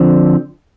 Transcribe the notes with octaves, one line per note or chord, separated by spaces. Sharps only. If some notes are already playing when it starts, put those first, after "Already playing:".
Already playing: D3 F3 C4